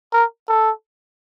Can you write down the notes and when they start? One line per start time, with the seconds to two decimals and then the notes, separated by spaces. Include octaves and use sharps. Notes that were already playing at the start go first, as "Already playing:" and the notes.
0.13 A#4
0.49 A4